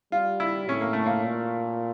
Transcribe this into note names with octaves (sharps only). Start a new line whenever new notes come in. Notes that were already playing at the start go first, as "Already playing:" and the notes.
G3 F4
E4
A2 C#4
A#3
A3
A#3
A#2